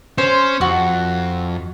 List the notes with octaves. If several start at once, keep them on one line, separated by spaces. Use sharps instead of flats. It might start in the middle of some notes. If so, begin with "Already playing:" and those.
C#4 C5
F2 F#4